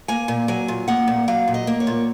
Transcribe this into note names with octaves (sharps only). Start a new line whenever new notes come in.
A#3 G#5
A#2
F#3 G#5
A#2
A#3 F#5
A#2
F#3 F5
A#2
D#5
A#3
C#5
A#2